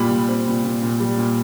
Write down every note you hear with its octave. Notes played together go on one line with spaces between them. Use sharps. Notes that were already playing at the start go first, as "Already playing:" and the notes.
Already playing: A#2 G3 B5
A#2
C4
A#2
A#2
A#2
G3
A#2